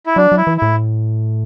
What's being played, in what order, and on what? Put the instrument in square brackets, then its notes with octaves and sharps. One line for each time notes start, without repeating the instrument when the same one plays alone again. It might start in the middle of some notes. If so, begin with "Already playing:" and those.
[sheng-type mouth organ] E4
[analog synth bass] F#3 [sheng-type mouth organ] D4
[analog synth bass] F#3
[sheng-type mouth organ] E4
[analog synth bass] E3
[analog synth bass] A2 [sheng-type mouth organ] E4